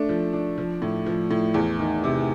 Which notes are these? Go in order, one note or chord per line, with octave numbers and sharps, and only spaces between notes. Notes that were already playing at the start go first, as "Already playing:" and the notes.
Already playing: A3 D4
F3
D4
F3
A2
F3
A2
E2
D#3
C3